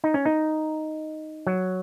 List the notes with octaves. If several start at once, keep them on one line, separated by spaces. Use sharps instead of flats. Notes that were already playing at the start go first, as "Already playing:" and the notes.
D#4
C#4
D#4
F#3